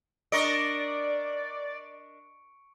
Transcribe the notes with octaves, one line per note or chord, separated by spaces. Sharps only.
D4 A#4 D5 D#5 C#6 C#7 D7